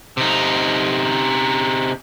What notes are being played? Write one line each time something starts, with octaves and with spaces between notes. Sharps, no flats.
C3 D#4